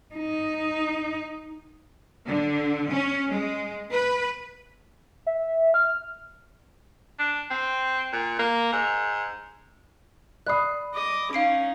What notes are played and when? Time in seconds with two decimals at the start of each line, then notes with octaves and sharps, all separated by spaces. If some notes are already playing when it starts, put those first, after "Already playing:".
0.15 D#4
2.27 D3
2.91 C#4
3.30 G#3
3.93 B4
5.27 E5
5.74 F6
7.19 D4
7.51 C4
8.13 A#2
8.39 A#3
8.72 G#2
10.46 D5 B5 D#6 F#6 C7
10.95 D#5 D6
11.33 C#4 D#4 F5 C7 D7